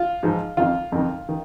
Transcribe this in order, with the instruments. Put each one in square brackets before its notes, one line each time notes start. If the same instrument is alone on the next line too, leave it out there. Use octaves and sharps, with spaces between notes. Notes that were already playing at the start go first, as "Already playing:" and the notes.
Already playing: [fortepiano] F4
G#2 F3
F2 D#3 F4
F2 D#3
D#3